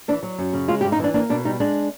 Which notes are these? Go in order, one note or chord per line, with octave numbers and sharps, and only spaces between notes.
E3 D4
F#3
F#2
C#3
G#3 F4
G4
G2
D#4
E3 D4
A#3 D4
B2 D4
G3 D#4
G#3 D4